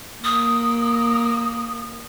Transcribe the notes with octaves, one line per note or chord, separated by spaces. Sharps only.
A#3 D#6